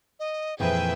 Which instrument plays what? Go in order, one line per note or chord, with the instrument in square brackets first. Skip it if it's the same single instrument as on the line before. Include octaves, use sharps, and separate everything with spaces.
[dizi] D#5
[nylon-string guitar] F2 A#2 E3 [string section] G#4 B4 E5 [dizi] G5